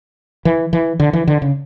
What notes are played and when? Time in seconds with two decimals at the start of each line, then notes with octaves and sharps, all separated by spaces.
0.45 E3
0.73 E3
1.00 D3
1.13 E3
1.27 D3
1.42 C#3